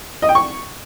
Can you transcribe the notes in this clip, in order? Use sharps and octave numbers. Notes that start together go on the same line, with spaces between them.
D#5
G5
C#6